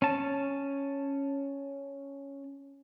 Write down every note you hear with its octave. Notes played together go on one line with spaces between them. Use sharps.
C#4 A5